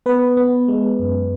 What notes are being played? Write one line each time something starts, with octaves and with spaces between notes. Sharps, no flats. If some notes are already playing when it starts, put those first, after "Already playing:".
B3 B4
B3
G#3
F#2